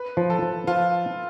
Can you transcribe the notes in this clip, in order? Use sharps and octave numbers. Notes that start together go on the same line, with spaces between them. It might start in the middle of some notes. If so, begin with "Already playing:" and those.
Already playing: B4
F3
A4
F3
F3 F4